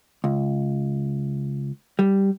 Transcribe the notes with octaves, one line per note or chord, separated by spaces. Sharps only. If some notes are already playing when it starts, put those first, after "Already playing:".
C#2
G3